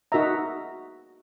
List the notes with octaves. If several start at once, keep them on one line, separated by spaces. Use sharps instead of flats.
D#4 F#4 A#4 E5 A#5